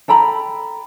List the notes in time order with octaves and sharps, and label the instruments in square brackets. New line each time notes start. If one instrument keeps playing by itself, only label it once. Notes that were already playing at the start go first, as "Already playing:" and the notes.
[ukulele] A4 G5 A#5 B5